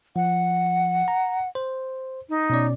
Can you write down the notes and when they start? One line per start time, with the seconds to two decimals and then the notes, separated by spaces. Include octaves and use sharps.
0.16 F3 F#5
1.08 A#5
1.55 C5
2.29 D#4
2.50 B2 C#4 D5